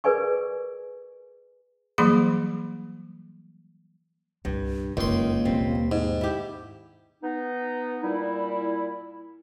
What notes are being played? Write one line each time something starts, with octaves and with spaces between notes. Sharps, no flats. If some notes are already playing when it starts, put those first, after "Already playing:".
G#4 A#4 B4 D5 G#5 C#6
E3 F#3 G3 A#3 G#4 B5
C2 G2 A#2
F1 C#2 F#2 D#3 A#3 C6
D#2 B2 G3 C4
G#2
E4 G4
B3 D#4
A#2 G3 E4